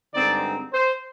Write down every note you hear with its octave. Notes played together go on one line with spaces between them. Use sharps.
G2 D3 G#3 C4 D#4 D5
C5